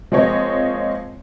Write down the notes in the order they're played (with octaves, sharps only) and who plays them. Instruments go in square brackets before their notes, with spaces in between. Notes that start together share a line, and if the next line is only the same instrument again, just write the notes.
[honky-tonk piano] F3 G#3 A#3 C4 C#5 D#5